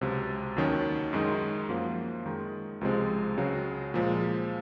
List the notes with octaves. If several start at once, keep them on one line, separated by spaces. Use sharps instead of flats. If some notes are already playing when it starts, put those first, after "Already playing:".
C#2 C3 F#3
D#2 D#3 F#3 C#4
F#2 D#3 G#3 D#4
F#2 F3 A#3
F#2 D#3 G#3 D#4
C#2 C3 F3 G#3 C4
C#2 C#3 F#3
A#2 F3 G#3